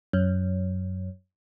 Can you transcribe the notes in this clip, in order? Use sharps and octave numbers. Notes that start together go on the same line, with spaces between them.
F#2